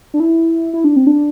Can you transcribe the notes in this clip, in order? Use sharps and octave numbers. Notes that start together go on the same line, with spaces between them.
D4
E4
E4
D4
C4
D4